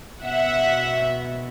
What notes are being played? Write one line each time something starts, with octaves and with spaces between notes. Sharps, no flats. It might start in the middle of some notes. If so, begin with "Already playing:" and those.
B2 E5 F#5